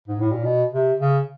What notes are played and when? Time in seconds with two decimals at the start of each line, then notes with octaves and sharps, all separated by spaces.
0.08 G#2
0.20 A2
0.32 A#2
0.44 B2
0.73 C3
1.00 C#3